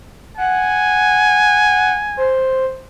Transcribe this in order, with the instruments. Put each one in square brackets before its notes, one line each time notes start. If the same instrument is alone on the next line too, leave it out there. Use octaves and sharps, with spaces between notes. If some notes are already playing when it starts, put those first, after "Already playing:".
[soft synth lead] F#5 [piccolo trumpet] G#5
[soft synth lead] C5